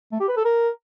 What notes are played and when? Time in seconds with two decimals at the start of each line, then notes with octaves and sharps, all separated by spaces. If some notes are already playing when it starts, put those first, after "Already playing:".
0.12 A3
0.20 G4
0.29 B4
0.37 A4
0.45 A#4